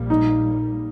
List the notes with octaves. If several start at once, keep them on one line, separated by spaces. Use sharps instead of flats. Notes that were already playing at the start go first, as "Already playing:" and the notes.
Already playing: A#1 A#2 G3 A#3
D#4